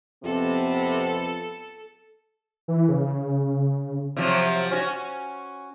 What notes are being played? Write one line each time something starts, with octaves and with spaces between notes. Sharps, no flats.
F2 C3 B3 A4
E3
C#3
C3 F3 F#3
C#4 F#4